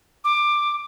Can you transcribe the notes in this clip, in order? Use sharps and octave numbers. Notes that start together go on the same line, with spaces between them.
D6